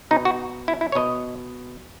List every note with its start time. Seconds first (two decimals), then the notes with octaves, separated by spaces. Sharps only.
0.11 B2 D#4
0.25 F#4
0.68 E4
0.81 E4
0.92 C#5
0.95 B2 D#5